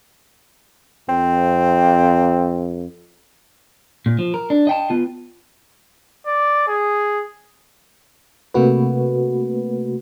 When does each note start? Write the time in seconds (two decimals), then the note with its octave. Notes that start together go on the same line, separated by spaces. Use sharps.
1.09 F2 C4
4.06 A#2
4.19 F3
4.34 A#4
4.50 D4
4.67 D#5 G5 A5
4.90 B3 F4
6.26 D5
6.68 G#4
8.54 C3 A3 A#3 F#4 B4